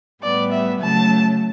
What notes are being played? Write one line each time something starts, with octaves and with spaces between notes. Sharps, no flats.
A2 G3 B3 D5
E5
C#3 F#3 A3 A5